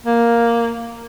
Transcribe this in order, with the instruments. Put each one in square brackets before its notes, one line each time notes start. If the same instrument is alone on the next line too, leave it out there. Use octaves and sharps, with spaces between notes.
[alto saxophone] A#3